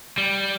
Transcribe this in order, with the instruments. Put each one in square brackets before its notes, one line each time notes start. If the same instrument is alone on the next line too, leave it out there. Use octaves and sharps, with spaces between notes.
[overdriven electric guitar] G3